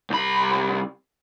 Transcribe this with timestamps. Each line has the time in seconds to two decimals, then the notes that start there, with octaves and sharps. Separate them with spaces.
0.10 C2 B5